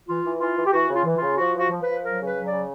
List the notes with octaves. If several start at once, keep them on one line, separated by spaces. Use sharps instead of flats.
E3 F4
E3
E3 F4
E3
G4
E3 F#4
C#3
F4
E3
C#3 F4
F3 F#4
F3 F#4
F3
F3 B4
F#3 A#4
C#3 B4
F#3
C#3 D5